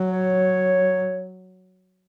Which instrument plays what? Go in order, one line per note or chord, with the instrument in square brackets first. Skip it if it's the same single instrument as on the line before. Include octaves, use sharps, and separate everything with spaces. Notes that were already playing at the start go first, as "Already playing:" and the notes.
Already playing: [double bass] F#3
[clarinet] C#5